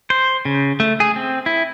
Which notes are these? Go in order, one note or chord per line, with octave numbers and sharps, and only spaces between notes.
C5
C#3
A3
G#4
C4
E4